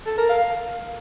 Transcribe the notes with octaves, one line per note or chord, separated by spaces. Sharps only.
A4
A#4
F5